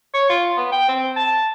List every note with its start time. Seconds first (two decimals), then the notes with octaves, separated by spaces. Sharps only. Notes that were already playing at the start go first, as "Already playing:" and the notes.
0.14 C#5
0.30 F4
0.57 B3
0.72 G5
0.89 C4
1.16 A5